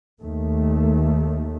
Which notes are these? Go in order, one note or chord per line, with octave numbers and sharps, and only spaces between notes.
D#2 D#3 A3